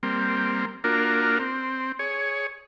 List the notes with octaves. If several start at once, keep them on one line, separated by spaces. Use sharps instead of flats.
G3 A#3 C4
A#3 D4 F4 F#4 A#4
C4
G#4 C#5